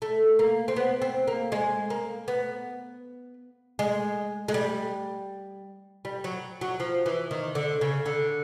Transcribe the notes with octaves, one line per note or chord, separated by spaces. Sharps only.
A3
A#3
C4
B3
C4
A#3
G#3
A#3
B3
G#3
G#3
G3
G3
F#3
F#3
F3
E3
D#3
D3
C#3
D3